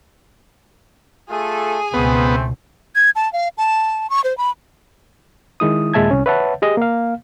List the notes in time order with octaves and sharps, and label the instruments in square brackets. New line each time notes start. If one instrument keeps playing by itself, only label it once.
[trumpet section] A3 F4 A4 [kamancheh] G#4 G#5
[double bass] C#2 B2 [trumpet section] A3 C4 C5 [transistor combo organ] B3
[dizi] G#6
A5
F5
A5
C#6
C5
B5
[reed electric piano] D#3 G#3 E4 D#6
D#2 A#2 G#3 E5 A5 G#6
C2 C#4
B4 C#5 E5 F#5 A5
G4 G#4 D#5
A#3 F5